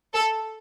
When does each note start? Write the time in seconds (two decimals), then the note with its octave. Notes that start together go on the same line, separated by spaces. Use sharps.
0.14 A4